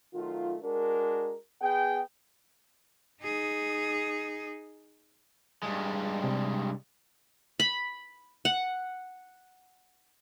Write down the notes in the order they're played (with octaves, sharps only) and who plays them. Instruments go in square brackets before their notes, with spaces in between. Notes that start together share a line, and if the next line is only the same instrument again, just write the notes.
[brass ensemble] D#3 F#3 A3 F4
G#3 D4 F#4 A#4
B3 G#4 G5
[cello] D#4 G#4
[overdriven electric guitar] G2 G#3
[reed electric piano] C3
[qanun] B5
F#5